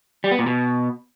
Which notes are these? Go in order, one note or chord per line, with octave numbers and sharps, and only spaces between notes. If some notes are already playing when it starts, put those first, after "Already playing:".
G3
B3
A#2
B2